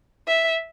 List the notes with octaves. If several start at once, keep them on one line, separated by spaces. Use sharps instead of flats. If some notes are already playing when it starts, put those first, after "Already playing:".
E5